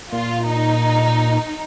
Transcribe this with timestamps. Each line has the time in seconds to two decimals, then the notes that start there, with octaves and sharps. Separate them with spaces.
0.12 A#2 F4
0.47 D#4